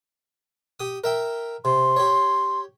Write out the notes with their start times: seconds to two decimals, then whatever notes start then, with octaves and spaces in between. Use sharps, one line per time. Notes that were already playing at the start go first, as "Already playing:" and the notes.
0.80 G4 D#6
1.04 A#4 E5 G5
1.65 C3 C6
1.96 G4 C#5